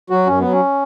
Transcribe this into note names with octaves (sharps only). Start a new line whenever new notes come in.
F#3 F#4
F#2 C#4
F#3 B3
C#4